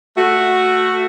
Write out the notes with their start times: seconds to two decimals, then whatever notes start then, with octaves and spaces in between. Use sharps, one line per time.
0.17 A3 F#4